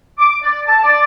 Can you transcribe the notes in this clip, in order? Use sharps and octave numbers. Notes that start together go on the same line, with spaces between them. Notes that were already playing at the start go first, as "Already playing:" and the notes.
D6
D5
A5
D5